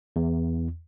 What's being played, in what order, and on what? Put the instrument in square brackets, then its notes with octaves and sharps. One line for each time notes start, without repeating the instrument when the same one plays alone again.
[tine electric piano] E2